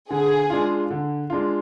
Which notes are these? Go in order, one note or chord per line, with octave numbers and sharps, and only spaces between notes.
D3 G#4
G#3 D4 F4
D3
G#3 D4 F4